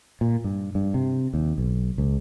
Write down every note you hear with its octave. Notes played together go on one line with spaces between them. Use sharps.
A#2
G2
G2
C3
D#2
B1
C#2